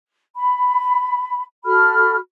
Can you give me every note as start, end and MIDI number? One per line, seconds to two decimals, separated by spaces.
0.35 1.44 83
1.65 2.17 66
1.65 2.17 69
1.65 2.17 83
1.65 2.17 89